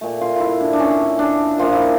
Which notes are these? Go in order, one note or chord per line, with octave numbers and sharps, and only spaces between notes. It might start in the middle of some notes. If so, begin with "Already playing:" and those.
A#2 A3
F4
E4 F4
D4
D4
C#4
D4
A#2 F3 A#3 F4
E4